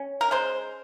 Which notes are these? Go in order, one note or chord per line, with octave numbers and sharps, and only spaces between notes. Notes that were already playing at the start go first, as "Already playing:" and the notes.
Already playing: C#4
A#4
G#3 C5